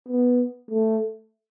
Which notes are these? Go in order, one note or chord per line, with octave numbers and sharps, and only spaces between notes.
B3
A3